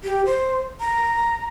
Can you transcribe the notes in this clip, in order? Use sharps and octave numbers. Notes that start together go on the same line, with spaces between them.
G4
C5
A#5